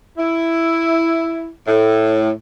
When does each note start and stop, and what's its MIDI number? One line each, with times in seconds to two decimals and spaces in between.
0.18 1.50 64
1.68 2.31 45